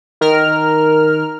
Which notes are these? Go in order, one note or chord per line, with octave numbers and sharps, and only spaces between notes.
D#3 A#4 F6